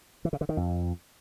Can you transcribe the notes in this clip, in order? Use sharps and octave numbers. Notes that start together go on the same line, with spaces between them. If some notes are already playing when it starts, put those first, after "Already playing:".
E3
C#3
D3
D#3
F2